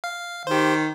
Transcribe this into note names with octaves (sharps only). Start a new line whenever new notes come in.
F5
D#3 G4 C5